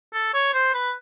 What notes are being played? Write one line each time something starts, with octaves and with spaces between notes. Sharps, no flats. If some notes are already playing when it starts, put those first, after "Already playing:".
A4
C#5
C5
B4